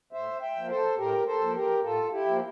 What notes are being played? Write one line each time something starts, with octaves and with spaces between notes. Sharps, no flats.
A2 C5 E5
E5 G5
F3 A#3
A4 C5
A2 G4 A#4
A4 C5
F3 A#3
G4 A#4
A2 F4 A4
E4 G4
F3 A#3